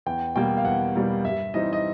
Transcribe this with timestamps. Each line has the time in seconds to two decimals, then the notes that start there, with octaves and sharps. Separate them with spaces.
0.06 E2 G5
0.36 B2 G3 A#3 G5
0.57 F5
0.65 E2 F#5
0.95 B2 G3 A#3
1.24 G2 E5
1.54 E3 G3 C4 D#4 D#5
1.73 D#5